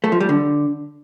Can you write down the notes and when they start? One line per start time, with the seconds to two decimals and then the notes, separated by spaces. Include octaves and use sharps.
0.04 A3
0.12 F3
0.20 G3
0.29 D3